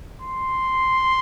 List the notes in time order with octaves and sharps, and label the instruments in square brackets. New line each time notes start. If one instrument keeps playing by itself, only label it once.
[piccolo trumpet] C6